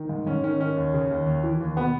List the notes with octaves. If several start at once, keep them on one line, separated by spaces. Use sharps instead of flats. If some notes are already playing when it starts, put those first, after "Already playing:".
Already playing: D#3
G#2
G#2 C#4
D#3 C#4
D#3 C#4
D#2
C#3
D#2
D#2
E3
D#2
B2 B3